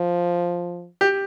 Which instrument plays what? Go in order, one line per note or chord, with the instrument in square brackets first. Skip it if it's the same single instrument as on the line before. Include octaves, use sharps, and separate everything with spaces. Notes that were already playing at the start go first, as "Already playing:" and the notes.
Already playing: [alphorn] F3
[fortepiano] G4